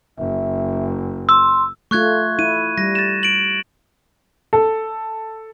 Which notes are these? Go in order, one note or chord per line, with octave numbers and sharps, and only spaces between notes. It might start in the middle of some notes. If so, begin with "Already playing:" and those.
F#1 E5
C6 E6
A3 F4 C#6 F#6 G#6
E4 D#7
G3 A#6
A6 E7
D7 F#7
A4